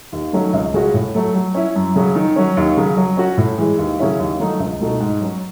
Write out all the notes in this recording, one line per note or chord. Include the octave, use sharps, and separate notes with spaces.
D#2
D#3 F#3 A3 C#4
C#2
C#3 G#3 C#4 F#4
A2
F#3 A3
F#3
C#4 E4
F#2
C#3 F#3
D#3
F#3 C#4
D#2
C#3 F#3
F#3
C#4 F#4
A2
E3 G#3
D#2
C#3 F#3 C#4 E4
D#2
D#3 F#3 A3 D#4
C#2
B2 A3 D#4 F#4
G#2
F#3 C#4